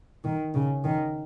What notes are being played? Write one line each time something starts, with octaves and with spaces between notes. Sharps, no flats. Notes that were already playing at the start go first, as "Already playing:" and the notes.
D#3
C#3
D#3